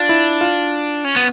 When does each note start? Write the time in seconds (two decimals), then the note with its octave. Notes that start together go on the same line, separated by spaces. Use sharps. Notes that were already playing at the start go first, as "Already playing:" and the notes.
Already playing: D4 F4
0.09 E4
0.41 F4
1.04 C#4
1.16 B3